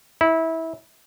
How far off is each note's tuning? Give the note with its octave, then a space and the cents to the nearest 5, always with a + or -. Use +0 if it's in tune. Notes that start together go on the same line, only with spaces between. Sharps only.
E4 -20